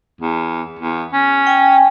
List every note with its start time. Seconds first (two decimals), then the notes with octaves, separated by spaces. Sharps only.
0.21 E2
0.79 E2
1.13 C#4
1.47 G5 G#5